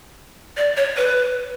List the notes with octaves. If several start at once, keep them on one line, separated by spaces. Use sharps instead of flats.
D5
C#5
B4